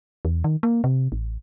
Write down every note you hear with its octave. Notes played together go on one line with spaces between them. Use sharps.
E2
D#3
A#3
C3
A1